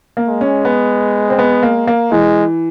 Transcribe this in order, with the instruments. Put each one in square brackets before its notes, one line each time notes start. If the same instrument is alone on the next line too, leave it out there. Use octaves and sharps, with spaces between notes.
[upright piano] A#3
[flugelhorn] G#3
[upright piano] C#4
B3
C4
B3
A#3
A#3
[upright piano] E3 [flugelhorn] G#3